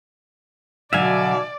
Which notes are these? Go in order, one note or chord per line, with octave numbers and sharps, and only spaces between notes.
B2 D3 F#3 D5 E5 F5 G#5